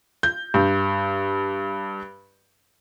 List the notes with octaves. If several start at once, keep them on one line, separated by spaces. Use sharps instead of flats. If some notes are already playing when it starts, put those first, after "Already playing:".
G6
G2